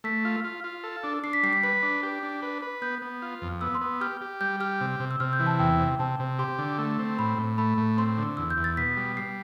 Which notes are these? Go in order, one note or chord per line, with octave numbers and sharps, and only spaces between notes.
A3 B6
F4
F4
F4
A4
D4
D4 C7
B6
G3 C7
B6
B4 B6
D4
G4
D4
B4
B4
B3 G6
B3
F4
F2
B3 E6
C6
B3
G4 F6
G4
G3 G6
G4 F6
C3
C3
E6
C3 F6
G6
E3
A5
E2 G5
C3
C3 A5
C3
G4 C6
D3
A3
C4
A2 B5
A2
A3 B5
A2
C4 C6
D3
E2 E6
G6
E2
A6
B2 B6
G3
G3 C7